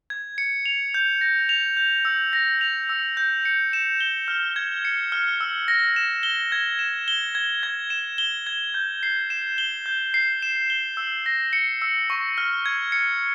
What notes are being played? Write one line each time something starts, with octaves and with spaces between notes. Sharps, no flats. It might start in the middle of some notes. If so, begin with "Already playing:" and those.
G#6
C#7
F7
G6
A#6
F7
G6
E6
A#6
F7
E6
G6
C#7
E7
G7
F6
G#6
C#7
F6
E6
A#6
E7
G7
G#6
E7
G7
G#6
G#6
E7
G7
G#6
G6
C7
E7
G7
G6
C7
E7
G7
E6
A#6
C#7
E6
C#6
F6
G#6
C#7